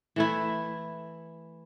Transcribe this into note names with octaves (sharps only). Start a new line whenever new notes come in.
E3 A3 E4